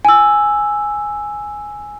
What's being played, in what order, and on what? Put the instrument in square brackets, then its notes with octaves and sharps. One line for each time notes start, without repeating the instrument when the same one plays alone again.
[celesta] G#5 E6